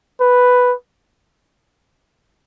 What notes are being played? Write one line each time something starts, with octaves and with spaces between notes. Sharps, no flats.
B4